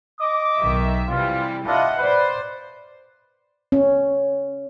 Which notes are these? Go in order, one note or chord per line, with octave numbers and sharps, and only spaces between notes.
D#5 D6
B1 D#3 E5
C3 E3 G3 F4
D4 E4 F4 D#5 E5 F#5
B4 C5 D5
C#4